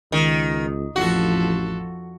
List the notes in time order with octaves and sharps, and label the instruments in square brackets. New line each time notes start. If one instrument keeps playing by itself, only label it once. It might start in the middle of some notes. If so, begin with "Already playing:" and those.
[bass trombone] C#2 [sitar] D#3
[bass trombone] A1 [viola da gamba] F2 F3 A4 [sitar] F#4